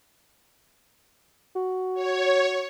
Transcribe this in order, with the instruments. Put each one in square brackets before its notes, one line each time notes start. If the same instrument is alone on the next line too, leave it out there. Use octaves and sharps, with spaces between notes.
[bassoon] F#4
[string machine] C#5